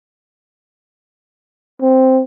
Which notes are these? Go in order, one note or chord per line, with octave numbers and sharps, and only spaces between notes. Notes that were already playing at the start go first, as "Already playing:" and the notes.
C4